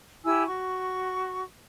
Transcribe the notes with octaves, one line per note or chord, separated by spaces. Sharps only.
E4 G4 G#5 E6
F#4 C#6